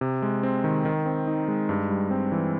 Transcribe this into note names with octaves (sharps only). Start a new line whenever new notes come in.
C3
G#3
C4
D#3
D#3
C4
D#4
G#3
G2
G3
C4
E3